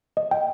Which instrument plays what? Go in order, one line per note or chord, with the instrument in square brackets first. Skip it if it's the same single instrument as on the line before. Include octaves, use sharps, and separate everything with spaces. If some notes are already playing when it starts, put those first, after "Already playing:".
[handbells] D#5
G5